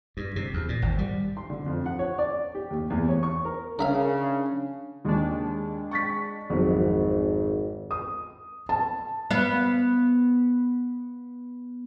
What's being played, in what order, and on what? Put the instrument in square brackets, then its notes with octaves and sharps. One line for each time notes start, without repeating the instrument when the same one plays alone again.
[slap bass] G2
C3
E2
A#2
G#1
G3
[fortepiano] C6
D3
F2
F#5
C#5
D5
G4
D#2
E2
C#5
C#6
A#4
[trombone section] C#3 [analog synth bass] D4 [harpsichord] A#4 E5 F5
[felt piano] D#2 [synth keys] G#3 D4
[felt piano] C#6 A6 B6
[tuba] G#1 [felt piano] F2 F#3
[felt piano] D#6
A5
[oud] B3 F5